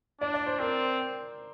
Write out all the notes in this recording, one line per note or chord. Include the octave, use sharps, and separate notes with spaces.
D4 D5
D5
C5
C4 A#4